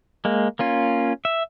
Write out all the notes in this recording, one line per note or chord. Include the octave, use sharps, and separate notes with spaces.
G#3 A#3
A#3 C#4 F4
E5